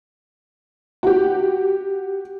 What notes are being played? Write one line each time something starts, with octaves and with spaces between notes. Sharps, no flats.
F#4 G4